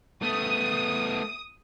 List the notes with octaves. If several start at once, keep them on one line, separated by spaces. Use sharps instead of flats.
A3 B3 D#6